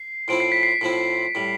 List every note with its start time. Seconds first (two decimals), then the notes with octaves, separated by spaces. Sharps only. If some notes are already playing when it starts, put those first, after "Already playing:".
Already playing: C7
0.28 A2 F3 C4 E4 D7
0.40 C7
0.52 B6
0.63 C7
0.81 A2 F3 C4 E4
1.35 A2 G3